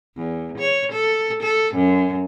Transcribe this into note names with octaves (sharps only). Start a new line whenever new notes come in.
E2
C#5
A4
A4
F#2